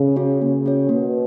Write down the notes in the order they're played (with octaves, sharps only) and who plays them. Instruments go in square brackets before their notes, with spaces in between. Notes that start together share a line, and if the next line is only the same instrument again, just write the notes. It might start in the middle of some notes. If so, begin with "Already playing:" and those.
Already playing: [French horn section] C#3
[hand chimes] C#4 F#4 C#5
[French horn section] C#3 [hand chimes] A#3
[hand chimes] C#4 F#4 C#5
[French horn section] B2 [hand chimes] A#3